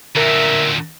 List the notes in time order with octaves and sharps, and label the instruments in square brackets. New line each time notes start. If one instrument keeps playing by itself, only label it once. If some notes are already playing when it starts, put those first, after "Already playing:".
[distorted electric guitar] D2 A#2 [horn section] A#4 E5